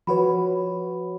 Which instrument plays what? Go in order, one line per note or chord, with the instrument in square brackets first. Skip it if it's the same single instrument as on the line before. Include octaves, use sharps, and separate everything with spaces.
[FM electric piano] F3 F#4 C#5 [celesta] B4 B5